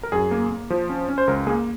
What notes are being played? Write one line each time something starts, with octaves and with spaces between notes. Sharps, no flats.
A#4
F#2 G#4
A#3
A#3
F3
C#4
C#4
C5
C#2 A#4
A#3 G#4